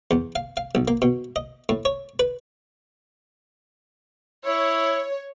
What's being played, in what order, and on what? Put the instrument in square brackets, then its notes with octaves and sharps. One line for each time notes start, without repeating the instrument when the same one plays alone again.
[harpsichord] E2
F5
F5
B1
A#3
B2
D#5
A2
C#5
B4
[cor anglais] E4 [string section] C#5